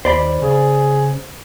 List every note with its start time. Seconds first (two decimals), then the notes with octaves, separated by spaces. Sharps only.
0.05 D#2 C5 D5 B5
0.42 C#3 G#4